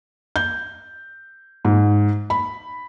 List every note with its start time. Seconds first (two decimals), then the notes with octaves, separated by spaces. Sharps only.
0.36 G6
1.65 G#2
2.30 B5